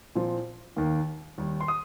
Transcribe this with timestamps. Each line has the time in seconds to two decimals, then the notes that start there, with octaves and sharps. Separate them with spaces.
0.15 A#2 F3 C4
0.76 D#2 D#3 A#3
1.38 D#2 D#3 G3
1.61 C6
1.68 D#6